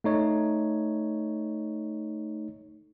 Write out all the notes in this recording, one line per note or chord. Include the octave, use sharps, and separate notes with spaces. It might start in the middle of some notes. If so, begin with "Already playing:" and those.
A3 D#4 C#5